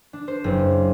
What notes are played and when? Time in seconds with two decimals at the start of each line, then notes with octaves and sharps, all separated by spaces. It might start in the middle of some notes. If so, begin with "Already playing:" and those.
0.13 D4
0.28 C5
0.44 F#1